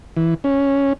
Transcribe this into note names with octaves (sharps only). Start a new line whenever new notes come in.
E3
C#4